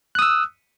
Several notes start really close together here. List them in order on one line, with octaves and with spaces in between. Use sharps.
F#6 D#6 E6